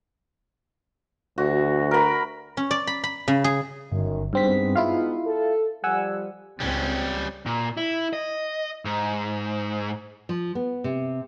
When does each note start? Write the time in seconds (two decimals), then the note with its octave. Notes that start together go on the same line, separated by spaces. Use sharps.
1.38 D2 F#4
1.91 A#4 B5
2.57 C#4
2.71 D5
2.87 B5
3.04 B5
3.28 C#3
3.44 G#4
3.92 G1 F#2 D#3
4.33 G2 G#3 B3 C4 D#4 B6
4.76 E4 F4 F5
5.25 A4
5.84 F3 G3 F#5 G#5 E6
6.60 C#2 G3 C4 C#4
7.46 A#2
7.77 E4
8.13 D#5
8.85 G#2
10.29 F3
10.55 B3
10.84 C3